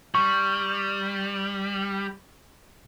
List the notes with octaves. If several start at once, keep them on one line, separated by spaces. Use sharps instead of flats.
G3 C#6